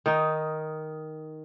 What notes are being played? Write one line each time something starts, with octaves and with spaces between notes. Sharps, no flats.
D#3 D#4